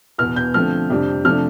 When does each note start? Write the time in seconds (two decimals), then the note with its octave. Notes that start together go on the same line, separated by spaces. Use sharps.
0.18 E2 B2 B3 F6
0.36 G6
0.54 D3 F3 A3 C4 F6
0.90 F2 C3 G3 D4
1.24 C3 F3 A3 D4 F6